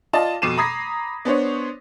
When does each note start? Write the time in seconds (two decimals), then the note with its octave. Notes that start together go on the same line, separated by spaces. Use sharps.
0.13 F4 D5 D#5 A5
0.42 F2 B2 D6 C7 D#7 E7
0.57 A#5 B5 D#6 G#6 A#6 C7
1.25 B3 D4 C5 C#5